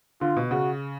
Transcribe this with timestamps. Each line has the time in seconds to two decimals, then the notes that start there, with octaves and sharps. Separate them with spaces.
0.21 D3 F4
0.36 B2
0.51 C#3 F#4